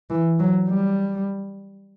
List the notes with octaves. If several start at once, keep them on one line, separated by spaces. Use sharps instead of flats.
E3
F#3
G3